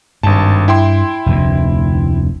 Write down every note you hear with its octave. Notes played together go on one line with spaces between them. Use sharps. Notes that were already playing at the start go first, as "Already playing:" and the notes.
G#1 G2 A5
E4 G5 C6
F1 D2